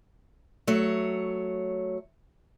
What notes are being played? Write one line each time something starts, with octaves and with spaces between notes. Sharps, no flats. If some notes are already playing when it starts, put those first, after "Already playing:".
F#3 A3 C#5